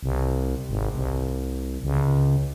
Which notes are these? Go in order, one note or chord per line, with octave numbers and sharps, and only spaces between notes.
C2
G#1
C2
C#2